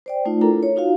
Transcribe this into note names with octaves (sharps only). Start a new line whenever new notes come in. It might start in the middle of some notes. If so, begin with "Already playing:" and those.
C5 D5 G5
A3 D#4 F4
D4 E4 F4 A4 A#4 A#5
C#5
D#4 F4 F#4 F5